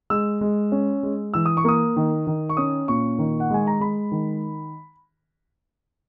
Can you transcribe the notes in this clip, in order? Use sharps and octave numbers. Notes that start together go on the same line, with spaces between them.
G#3 E6
G#3
C#4
G#3
E3 E6
D#6
C#6
A#3 D#6
D#3
D#3
C#6
C#4 D#6
A#2 C#6
D#3
F#5
G#3 G#5
A#5
G#3 B5
D#3